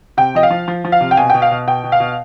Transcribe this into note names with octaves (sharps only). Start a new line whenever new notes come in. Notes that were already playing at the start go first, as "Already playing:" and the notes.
C3 G5
F3 D#5
F5
F3
F3
F3
F5
C3
G5
B2 G#5
B2 G5
F5
B2
B2 G5
B2
F5
B2